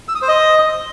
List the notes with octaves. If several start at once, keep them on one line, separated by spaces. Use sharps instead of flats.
E6
D#6
C5
D#5